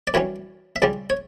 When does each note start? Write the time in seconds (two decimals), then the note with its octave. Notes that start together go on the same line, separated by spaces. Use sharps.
0.07 D5
0.14 F#2 E3 G3 C#4 C#5
0.76 E5
0.82 C#2 C#3 G3 D5
1.10 C#5